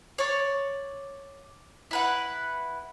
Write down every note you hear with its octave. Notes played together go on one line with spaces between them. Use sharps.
C#5 D5
E4 B4 F#5